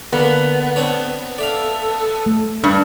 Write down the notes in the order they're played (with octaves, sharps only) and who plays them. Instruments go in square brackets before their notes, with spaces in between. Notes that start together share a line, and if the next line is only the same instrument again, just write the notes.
[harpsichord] D3 A#3 [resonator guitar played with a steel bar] B3
[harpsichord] C4 D4 C#5
[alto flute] A4 [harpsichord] D5 E5 F5
[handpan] A3
[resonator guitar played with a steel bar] G2 [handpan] D4